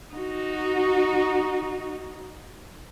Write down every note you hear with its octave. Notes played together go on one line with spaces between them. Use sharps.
D#4 F#4